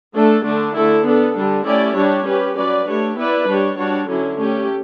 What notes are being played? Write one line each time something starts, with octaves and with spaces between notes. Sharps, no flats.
A3 D4 A4
D3 A3 D4
D3 A3 E4 A4
B3 D4 A4
D3 G3 D4
A3 C#4 E4 G4 D5
G3 D4 G4 C#5
C#4 G4 B4
F#3 C#4 F#4 B4 D5
A3 D4 G4 C#5
B3 E4 B4 D5
G3 D4 G4 C#5
G3 D4 F#4 C#5
D3 F#3 C#4 E4
A3 C#4 G4